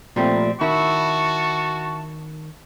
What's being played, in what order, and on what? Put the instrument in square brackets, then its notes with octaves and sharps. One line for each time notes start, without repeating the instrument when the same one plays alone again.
[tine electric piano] A#2 F3 A3 [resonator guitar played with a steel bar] G3 C4
[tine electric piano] D#3 [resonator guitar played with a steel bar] E4 [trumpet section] F#4 A5 C#6